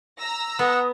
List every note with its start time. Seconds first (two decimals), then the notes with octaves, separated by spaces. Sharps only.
0.21 A#5 E6 A#6
0.59 B3 F#5 D#6